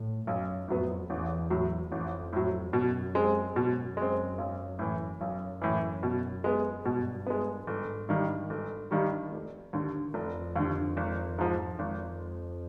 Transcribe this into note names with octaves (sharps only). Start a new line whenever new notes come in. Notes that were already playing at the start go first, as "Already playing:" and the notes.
Already playing: A2
B1 F#2
F2 A2 F#3 B3
A1 E2
A2 F#3
A1 F2
A2 F#3
F#2 B2
G#3 C4
F#2 B2
G#3 C4
B1
A2 E3
B1 F#2
A2 E3
B2
G#3 B3
G2 B2
G#3 B3
G1 G#2
G2 D#3 G3
G1
G2 D#3 G3
F1
D#2 D3
F1 F2
D#2 D3
G#1
G#2 F3
G#1 F2